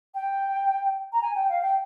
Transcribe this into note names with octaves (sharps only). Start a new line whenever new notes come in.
G5
A#5
G#5
G5
F5
G5